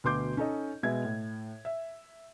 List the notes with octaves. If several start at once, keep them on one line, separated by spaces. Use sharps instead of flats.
D2 B2 B4 C6 D6 G6
C#4 D#4 A4 D#5
B2 G#3 E5 G#6
A2
E5